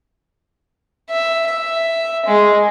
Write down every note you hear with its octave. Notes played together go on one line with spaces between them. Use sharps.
E5
E5
G#3